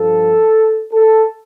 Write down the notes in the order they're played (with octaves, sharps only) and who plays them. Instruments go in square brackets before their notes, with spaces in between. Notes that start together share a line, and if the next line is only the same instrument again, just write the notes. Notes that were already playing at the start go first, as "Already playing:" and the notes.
Already playing: [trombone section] G2 F3 A4
A4